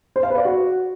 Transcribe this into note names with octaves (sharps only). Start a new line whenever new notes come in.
C5
F5
B4
D5
F#4